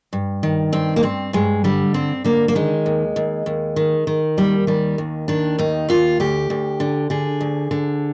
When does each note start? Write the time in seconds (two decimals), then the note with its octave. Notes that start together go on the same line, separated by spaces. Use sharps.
0.13 G2
0.43 D#3
0.73 G2 C4
0.96 A#3
1.03 G2 C4
1.33 G2 G#3
1.64 D3 G3
1.94 G2 C4
2.24 D3 A#3
2.48 A#3
2.55 D#3 G#3
2.86 D#2
3.16 D#2
3.46 D#2
3.76 D#3
4.07 D#3
4.37 D#2 G3
4.67 D#3 G3
4.98 D#2
5.28 D#3 D4
5.58 D#2 D#4
5.89 D#2 F4
6.20 D2 G4
6.50 D2
6.80 D3
7.10 D3 G#4
7.41 D2
7.71 D3